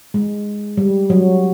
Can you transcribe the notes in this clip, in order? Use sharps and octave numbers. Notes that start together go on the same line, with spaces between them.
G#3
G3
F#3